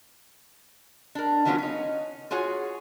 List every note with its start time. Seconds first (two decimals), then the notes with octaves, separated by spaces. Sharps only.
1.15 D4 A#4
1.45 D#3 E3 F#3 B3 C#4 F4
1.58 C#4 D#4
2.31 F4 F#4 G#4 C#5 G#5